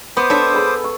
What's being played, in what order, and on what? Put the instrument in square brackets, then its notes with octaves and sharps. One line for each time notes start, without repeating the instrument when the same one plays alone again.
[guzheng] B3 [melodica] C5 D6 D#6 [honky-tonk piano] B5
[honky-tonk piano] D4 C#5 C6 [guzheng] A4 E5
[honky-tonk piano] G#4 B5
C#6